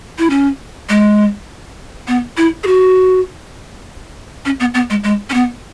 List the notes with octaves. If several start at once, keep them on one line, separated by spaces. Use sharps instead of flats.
E4
C#4
G#3
B3
E4
G#4
F#4
C#4
B3
B3
G#3
G#3
C#4
B3